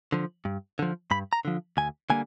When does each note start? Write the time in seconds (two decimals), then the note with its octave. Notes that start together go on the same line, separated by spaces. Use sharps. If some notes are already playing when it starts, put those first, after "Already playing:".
0.12 D3 F3
0.45 G2
0.79 D3 F3
1.11 G2 B5
1.33 A#5
1.45 D3 F3
1.77 D2 G#5
2.10 D3 G3 A#3 G#5